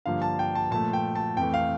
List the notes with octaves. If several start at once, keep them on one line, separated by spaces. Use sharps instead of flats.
G2 D3 F3 A#3 F5
A5
G5
A5
A#2 F3 A3 A5
G5
A5
F2 E3 A3 G5
F5